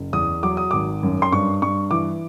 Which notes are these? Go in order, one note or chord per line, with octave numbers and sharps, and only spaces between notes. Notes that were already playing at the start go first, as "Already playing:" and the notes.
Already playing: F#1
E2 D#6
F#3 D6
D#6
G#1 D6
F#2
C6
G2 C#6
G2 C#6
E3 D6